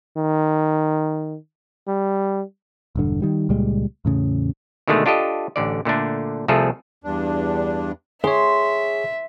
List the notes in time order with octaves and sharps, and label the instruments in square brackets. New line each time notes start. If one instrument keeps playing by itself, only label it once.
[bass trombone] D#3
G3
[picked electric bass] E1 G2 D3
D#3 G3
C#2 A#2 G3 G#3
E2 A2 C#3
[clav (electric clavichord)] B2 D3 D#3 G#3 A3
D4 F4 G4 A4 D#5
A1 D3 D5
A#2 D3 A3 D4
C2 C3 F3 A3 G#4 A4
[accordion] E2 G2 D4
[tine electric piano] G#4 C#5 [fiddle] E5 [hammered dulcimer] C6